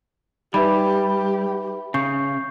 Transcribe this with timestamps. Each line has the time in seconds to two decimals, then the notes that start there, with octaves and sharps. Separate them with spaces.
0.54 G3 D#4 G4 B4 E5 B5
1.94 C#3 C#6 G6 C7